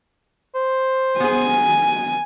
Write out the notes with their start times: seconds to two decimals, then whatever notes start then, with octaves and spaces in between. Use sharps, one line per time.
0.55 C5
1.20 B3 G#4 G#5